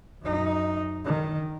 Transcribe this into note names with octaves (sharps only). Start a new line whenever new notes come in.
F#2 D#4
D#3